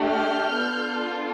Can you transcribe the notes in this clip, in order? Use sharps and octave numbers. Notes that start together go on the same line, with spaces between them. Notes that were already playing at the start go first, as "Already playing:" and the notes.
Already playing: A3 D4 G4
F6 G6
B3 D4 F4 A4